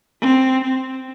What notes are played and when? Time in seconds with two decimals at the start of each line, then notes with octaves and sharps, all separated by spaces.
0.21 C4
0.63 C4